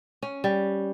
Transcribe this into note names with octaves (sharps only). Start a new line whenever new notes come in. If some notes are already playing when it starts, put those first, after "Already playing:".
C#4
G3